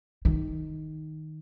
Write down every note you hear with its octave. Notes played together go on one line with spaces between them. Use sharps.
D#3